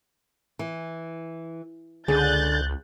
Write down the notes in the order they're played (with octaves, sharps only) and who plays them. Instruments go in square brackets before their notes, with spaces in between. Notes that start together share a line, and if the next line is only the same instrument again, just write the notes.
[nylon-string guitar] E3
[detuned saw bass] C#2 [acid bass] D3 [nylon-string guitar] G#4 [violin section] F#6 G6 A6